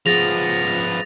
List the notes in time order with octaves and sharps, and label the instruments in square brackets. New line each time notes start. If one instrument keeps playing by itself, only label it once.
[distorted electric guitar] F3 B3 [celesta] G#4 [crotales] A6 A#6 F7